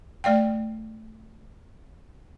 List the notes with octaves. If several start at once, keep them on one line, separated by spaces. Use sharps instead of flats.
A3 D5 F5 G5